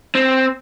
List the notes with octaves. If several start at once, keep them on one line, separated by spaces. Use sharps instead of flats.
C4